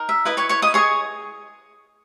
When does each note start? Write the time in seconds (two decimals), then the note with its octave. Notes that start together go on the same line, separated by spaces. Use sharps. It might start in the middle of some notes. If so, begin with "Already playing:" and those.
Already playing: D#4 A#4
0.09 E5
0.25 E4 B4 D#5
0.37 C#5 C#6
0.49 C#5 C#6
0.62 D#5 D#6
0.74 G#4 C#5 D#5 C#6